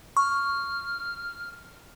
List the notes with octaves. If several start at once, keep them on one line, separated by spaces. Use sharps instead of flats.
C#6 F6